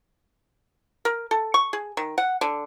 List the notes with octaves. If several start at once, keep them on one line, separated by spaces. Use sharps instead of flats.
A#4
A4
C#6
G#4
D#3
F#5
D3